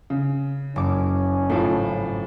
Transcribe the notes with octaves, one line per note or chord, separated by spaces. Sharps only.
C#3
F#1 C#4 D#4 D6
G#1 A2 F3